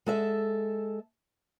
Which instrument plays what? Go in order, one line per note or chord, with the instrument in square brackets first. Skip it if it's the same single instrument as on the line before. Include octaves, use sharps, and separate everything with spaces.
[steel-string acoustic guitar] G#3 A4 E5